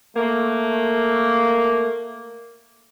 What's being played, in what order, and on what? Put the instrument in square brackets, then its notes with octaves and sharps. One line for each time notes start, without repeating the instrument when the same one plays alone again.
[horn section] A3 A#3